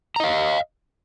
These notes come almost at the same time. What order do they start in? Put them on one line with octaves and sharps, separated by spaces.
A#5 D#5 F5